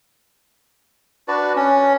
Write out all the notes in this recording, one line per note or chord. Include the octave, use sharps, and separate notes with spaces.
D4 F#4 B4 D5
C#4